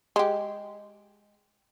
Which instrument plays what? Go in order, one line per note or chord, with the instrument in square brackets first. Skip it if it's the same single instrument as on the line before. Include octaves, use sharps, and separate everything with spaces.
[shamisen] G#3 G4